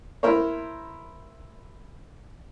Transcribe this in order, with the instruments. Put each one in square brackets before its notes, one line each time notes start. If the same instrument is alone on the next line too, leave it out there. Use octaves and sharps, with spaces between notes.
[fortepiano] E4 A#4 C5 C#5